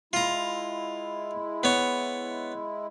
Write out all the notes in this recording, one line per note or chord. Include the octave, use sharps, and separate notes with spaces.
G#3 E4 F4 A#5
B3 C#5